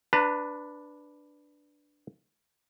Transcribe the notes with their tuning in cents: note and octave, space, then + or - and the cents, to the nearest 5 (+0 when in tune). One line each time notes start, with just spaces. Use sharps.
D4 +0 B4 +0 A#5 -40